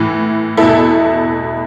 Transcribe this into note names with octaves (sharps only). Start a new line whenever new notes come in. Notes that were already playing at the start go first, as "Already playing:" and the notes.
Already playing: A2 E3
E2 B2 E4 A4